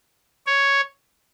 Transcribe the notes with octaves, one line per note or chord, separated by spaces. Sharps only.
C#5